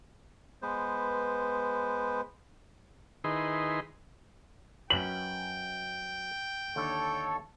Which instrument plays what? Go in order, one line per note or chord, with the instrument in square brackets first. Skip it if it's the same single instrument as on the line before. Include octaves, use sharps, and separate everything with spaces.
[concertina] G#3 B3 B4 C5
[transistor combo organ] D#3 D#4 E4 G#4 B4 C6
[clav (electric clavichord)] F#2 C#4 B4 [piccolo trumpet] G5 [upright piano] F#7
[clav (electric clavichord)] D#2 D3 [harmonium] A4 C#5